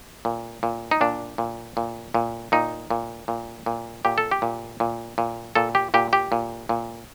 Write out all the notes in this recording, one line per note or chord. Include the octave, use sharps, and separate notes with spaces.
A#2
A#2
D#4
A#2 D4
A#2
A#2
A#2
A#2 D#4
A#2
A#2
A#2
A#2 G4
A4
G4
A#2
A#2
A#2
A#2 A4
G4
A#2 G4
G4
A#2
A#2